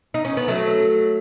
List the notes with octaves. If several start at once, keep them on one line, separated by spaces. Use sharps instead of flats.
D#4
C#4
B3
F#3 A3